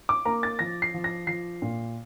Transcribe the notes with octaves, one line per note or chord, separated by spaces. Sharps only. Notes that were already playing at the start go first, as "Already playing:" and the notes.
D6
A#3 A#5
A6
F3 A#6
C7
F3
A#6
F3 C7
A#2